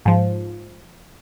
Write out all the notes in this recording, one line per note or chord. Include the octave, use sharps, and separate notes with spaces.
G#2 F3